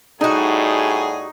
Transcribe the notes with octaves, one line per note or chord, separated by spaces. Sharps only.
A2 G3 D#4 F#4 G#4